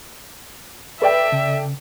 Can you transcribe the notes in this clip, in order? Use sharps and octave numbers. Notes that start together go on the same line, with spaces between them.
A4 B4 D5 E5 G5
C#3